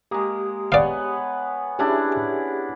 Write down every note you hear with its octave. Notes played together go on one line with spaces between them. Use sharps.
G#3 A#3 G4 D#6
B3 G#4 C#5 D5 F5
C#4 D4 E4 G4 G#4 E5